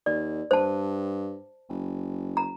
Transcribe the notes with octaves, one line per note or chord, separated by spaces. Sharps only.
D#2 D5
G2 C5 A5
F#1
A#5